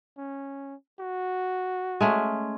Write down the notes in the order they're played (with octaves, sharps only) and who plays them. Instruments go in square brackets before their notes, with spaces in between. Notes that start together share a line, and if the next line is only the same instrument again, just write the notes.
[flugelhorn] C#4
F#4
[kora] G#3 A3 C#4